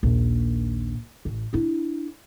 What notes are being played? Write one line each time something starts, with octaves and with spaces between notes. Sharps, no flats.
A#1 D#2
A1
D4 E4